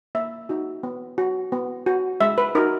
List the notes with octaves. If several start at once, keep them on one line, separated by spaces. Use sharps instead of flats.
A#3 E5
D#4 F#4
B3
F#4
B3
F#4
G#3 E5
B4
D#4 F#4 A#4